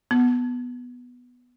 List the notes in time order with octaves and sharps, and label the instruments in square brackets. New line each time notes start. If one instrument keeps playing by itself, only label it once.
[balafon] B3